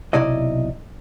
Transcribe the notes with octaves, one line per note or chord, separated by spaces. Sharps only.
B1 C3 E4 D5 D#5